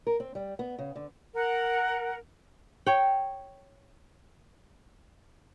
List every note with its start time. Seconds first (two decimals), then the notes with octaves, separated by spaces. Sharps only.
0.07 A#4
0.20 C4
0.35 G3
0.59 B3
0.79 C#3
0.96 D3
1.35 A#4 F#5
2.86 C#5 G5